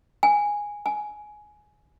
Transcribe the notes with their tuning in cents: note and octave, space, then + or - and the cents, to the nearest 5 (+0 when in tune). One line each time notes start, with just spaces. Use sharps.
G#5 -10
G#5 +15